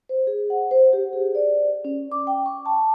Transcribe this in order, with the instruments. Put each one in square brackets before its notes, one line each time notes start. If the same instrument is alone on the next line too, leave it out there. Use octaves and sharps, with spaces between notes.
[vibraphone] C5
G#4
F#5
C5
G4
G#4
D5
C#4
D6
G5
C#6
A5